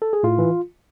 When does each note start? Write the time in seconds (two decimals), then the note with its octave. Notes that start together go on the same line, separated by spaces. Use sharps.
0.02 A4
0.13 G#4
0.23 A2 F4
0.39 E3